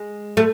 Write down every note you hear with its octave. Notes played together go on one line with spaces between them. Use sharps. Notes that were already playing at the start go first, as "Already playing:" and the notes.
Already playing: G#3
A3